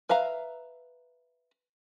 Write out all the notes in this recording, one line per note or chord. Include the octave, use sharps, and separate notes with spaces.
B4 E5 F5 A#5